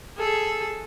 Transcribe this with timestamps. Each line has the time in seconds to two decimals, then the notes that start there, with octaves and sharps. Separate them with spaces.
0.17 G#4 A4